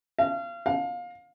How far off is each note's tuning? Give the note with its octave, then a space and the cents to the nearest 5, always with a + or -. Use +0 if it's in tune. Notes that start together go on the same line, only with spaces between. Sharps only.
F5 -30
F5 +25